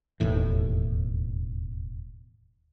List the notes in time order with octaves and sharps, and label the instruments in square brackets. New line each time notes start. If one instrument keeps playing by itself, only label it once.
[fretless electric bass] E1 D#2 A2 E3